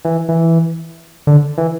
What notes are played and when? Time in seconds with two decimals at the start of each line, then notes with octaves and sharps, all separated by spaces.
0.05 E3
0.29 E3
1.27 D3
1.58 E3